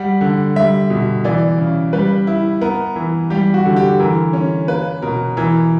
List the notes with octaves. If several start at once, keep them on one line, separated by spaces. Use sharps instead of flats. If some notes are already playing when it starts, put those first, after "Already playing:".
Already playing: G3 F#5
D3
G3 E5
B2
E3 D5
C#3
G3 B4
E4
B3 A#4
E3
G3 G4
F#4
D3
G4
E3 A#4
C#4
A#3 B4
B2 A#4
E3 A#4